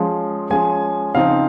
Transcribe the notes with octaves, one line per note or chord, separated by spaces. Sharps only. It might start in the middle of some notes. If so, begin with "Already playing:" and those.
Already playing: F3 G#3 C#4
F3 G#3 C#4 G#5
C#3 F3 C4 D#4 F5